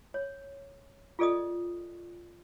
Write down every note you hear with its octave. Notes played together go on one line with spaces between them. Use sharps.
C#5
F4 G#4 A4 D5 D#5 D#6